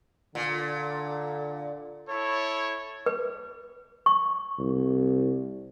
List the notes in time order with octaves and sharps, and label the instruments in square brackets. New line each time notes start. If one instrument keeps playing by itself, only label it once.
[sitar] A#2 [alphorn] D3
[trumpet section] E4 A4 C#5
[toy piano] B4
C#6
[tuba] C2